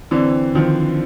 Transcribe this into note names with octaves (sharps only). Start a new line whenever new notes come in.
D3 E3 C4
D3 D#3 F3